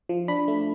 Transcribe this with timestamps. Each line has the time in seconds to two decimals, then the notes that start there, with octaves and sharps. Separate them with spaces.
0.09 F3
0.28 D4 B5
0.48 A3